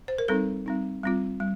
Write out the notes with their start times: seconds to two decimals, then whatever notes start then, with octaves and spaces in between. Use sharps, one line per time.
0.08 C5
0.18 A#4
0.28 G3 C4 D#4 A4
0.66 G3 C4 D#4
1.03 G3 C4 F4
1.40 G3